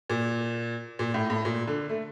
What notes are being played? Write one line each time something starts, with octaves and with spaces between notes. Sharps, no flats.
A#2
A#2
A2
A2
A#2
D3
A3